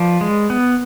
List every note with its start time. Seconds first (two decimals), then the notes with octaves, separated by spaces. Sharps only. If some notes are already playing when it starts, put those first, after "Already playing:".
Already playing: F3 B4 D5
0.21 G#3
0.50 B3